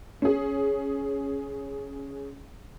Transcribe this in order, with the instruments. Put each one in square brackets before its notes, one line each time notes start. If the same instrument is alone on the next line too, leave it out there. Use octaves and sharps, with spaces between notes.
[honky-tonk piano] C#4 G#4